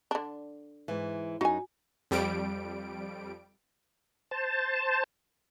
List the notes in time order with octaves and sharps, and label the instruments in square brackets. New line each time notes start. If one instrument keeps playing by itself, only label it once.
[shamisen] D3 D4
[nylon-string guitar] G#2 E3
[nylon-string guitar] F#2 D#4 [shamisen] F#4 G#5
[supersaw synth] F2 G3 D7
[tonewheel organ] C5 A5